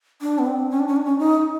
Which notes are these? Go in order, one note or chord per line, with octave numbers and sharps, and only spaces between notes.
D4
B3
C4
C#4
D4
C#4
D4
C#4
D#4